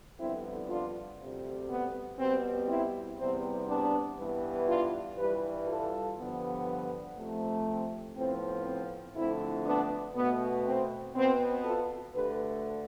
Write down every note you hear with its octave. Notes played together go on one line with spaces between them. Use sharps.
F2 D3 G3 B3 C4 E4
D4 F4
D2 C3 G3
B3
B2 G3 B3 C4
C4 E4
E2 C3 G3 B3 C4
B3 D4
G2 E3 B3
D4 F4
G2 E3 G3 G4 B4
F4 A4
G2 D3 F3 B3
F2 C3 F3 A3
C4
A2 F3 B3 C4
C4
F2 D3 A3 C4 E4
B3 D4
B2 A3 B3
C4
B2 B3 C4
F4 A4
D2 D3 A3 G4 B4